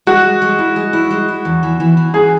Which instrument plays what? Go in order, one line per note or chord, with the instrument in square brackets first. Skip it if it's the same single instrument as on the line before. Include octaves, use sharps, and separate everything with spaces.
[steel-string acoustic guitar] G#3 [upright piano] F#4
[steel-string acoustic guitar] G#3
G#3
E4
G#3
E4
G#3
E4
E2
E3
E3
E3
[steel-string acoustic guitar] C#4 [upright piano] G#4